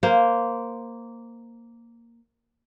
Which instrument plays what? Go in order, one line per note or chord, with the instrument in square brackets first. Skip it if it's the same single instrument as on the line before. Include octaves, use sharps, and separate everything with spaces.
[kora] A#3 C5